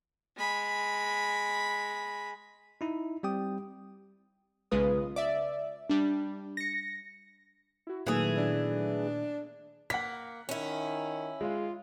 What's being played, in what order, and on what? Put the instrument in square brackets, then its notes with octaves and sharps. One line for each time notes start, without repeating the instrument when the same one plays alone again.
[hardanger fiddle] G#3 B5
[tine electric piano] D#4 E4
G3 C4 G4 G5 D#6
[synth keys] B1 C#3 G#3 F4 B4 D#6
D5 E5
G3 D4
A#6 C#7
E4 F#4
[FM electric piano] A#2 D#3 [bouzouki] E3 G#4 [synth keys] F#3 A3 B3
[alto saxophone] D4
[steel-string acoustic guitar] A#3 [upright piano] F#5 B6
[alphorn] D#3 [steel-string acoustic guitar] C#4 E4
[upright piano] G#3 [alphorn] F4